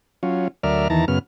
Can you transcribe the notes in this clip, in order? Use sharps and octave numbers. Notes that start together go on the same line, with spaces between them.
F#3 C#4 F4
D2 F#3 A#4 D5 E5 F6
E2 D#3 E3 A5 A#5
F#2 C#3 B3 F6